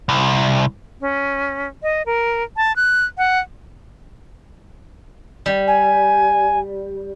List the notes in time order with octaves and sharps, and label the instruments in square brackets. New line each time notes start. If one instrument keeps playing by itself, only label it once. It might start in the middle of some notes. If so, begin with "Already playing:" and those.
[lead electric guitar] C2
[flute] C#4
D#5
A#4
A5
F#6
F#5
[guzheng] G3
[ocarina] G#5